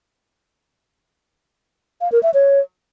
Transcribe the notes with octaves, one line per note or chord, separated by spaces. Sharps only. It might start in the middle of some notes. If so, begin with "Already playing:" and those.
F5
A#4
E5
C#5